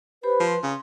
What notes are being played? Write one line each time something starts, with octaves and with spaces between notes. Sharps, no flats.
G4 B4 C5 B5
F3 C6
C#3